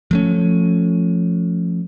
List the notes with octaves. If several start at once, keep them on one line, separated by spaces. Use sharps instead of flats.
F3 A3 C#4